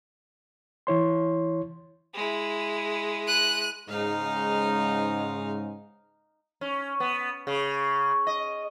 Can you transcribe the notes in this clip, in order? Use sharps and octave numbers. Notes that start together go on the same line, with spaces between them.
E3 E4 C#5 C6
G#3 E4
F#6 D#7
G#2 C#3 G#3 D#4 F5
C#4
B3
C#3
D#5